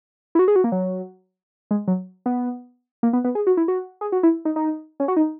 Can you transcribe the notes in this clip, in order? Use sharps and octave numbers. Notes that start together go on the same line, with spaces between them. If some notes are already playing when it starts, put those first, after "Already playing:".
E4
F#4
G#4
F#4
A#3
F#3
G#3
F#3
B3
A#3
B3
B3
G#4
F#4
E4
F#4
G#4
F#4
E4
D#4
D#4
C#4
F#4
D#4